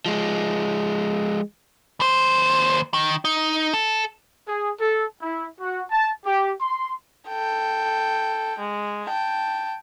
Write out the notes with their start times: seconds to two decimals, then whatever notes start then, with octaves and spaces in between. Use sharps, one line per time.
0.06 F3 G#3
2.00 D#2 C5
2.94 D#3
3.25 D#4
3.74 A4
4.48 G#4
4.79 A4
5.22 E4
5.60 F#4
5.91 A5
6.25 G4
6.61 C6
7.28 A4 G5
8.59 G#3
9.06 G5 A5